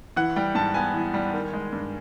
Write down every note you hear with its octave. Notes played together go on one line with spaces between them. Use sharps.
E3 F#5
G3 G5
G#2 A5
B3 G#5
E3
G3
D#3
G#3
G2